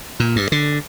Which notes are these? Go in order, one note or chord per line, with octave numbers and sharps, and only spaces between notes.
A#2
G2
D3